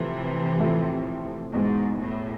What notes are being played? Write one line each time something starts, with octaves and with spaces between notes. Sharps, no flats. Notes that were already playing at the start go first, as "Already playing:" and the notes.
Already playing: A2 C3 E3 F3 A3 C4 E4
A2 F3 A3 C4 E4
E2 G#2 B2 G#3
A2